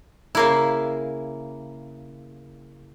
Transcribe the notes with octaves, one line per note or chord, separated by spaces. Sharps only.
C#3 A#3 E4